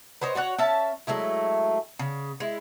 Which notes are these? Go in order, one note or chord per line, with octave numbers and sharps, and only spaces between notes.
B3 C#4 C5 D#5
F#4 C#5 D5 F#5
C#4 E5 A5
F#3 G#3 A3 E4
C#3
G#3 E4